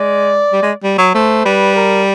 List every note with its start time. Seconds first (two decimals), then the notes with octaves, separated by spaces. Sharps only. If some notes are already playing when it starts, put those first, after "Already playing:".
Already playing: G#3 D5
0.53 G3
0.63 G#3
0.84 G3
0.99 F#3
1.14 A3 C5
1.45 G3 B4
1.76 A#4